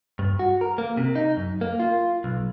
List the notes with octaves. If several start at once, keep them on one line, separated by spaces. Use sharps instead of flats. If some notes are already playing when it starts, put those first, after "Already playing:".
G2
F#4
A#4
A#3
C3
D#4
F#2
A#3
F4
B1